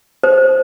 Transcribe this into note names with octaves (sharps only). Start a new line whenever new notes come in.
C5